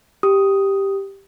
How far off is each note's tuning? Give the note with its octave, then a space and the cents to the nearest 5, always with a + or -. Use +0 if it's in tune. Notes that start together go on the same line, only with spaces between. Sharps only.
G4 +0 D#6 +5